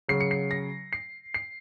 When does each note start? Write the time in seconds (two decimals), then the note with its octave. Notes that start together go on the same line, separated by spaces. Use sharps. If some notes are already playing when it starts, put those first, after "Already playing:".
0.08 C#3 F#3 C7
0.21 C#7
0.31 C7
0.51 A#6
0.93 C7
1.34 C7